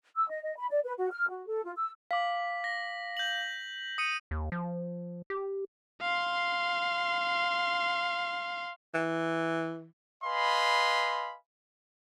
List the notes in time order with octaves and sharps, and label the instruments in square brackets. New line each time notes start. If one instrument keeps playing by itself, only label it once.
[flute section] E6
D#5
D#5
B5
D5
B4
F#4
F6
F#4
A4
F4
E6
[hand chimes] F5 D6 [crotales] B6 F#7
[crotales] A#6
G6 F#7
D#6 C#7 D#7
[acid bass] D#2
F3
G4
[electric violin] F5 C6
[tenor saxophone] E3
[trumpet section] B4 D#5 F5 G#5 B5 C6